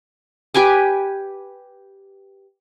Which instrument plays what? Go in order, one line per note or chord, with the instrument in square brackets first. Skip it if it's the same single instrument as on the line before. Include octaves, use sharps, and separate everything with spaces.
[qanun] G4 B4 G#5 D6